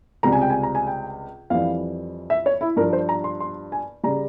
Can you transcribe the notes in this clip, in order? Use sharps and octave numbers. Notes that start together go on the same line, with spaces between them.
C#2 C3 G3 A#5
G#5
G5
G#5
A#5
G#5
G5
F2 E3 G3 F5
E5
C#5
E4
G2 F3 A#4
C5
A#5
C6
C6
G#5
C#3 G3 A#5